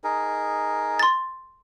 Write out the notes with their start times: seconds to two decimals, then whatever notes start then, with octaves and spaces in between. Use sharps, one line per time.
0.04 D#4 G#4 A#4
0.99 C6 A6